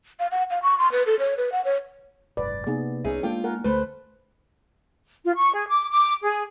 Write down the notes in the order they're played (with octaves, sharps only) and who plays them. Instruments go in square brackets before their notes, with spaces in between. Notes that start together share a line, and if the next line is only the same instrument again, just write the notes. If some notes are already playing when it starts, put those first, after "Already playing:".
[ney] F5
F#5
F5
C#6
C6
B4
A4
C#5
B4
F#5
C#5
[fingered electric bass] F#1 C2 G#2 [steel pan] B4 [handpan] D5
[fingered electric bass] C3 A#3 [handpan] B3 [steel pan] D#4 G#4
[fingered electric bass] C2 [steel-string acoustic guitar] C#4 D#4 G#4 [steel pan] E5
[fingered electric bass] G#3 A#3 [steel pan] D4 A4 G5 [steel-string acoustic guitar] F4
[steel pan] A#4 F#5 G#5
[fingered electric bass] D2 [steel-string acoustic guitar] A3 C5 [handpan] B4
[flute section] F4
C#6
G#4
D6
D6
G#4